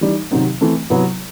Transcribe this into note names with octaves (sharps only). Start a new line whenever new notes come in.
E3 G3 D#4
C3 D#3 F#3 C4 D#4
E3 A3 C4
C3 F#3 B3 E4